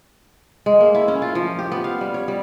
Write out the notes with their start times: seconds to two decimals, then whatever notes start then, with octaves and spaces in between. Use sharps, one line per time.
0.66 G#3
0.81 A#3
0.95 E4
1.08 C#4
1.22 F4
1.35 F3
1.59 G4
1.72 B3
1.84 F5
2.01 G3
2.14 C#5
2.28 G3